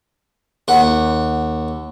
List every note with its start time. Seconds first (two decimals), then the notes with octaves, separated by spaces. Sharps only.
0.68 D#2 F#5